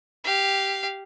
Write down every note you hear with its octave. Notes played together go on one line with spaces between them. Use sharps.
G4 F5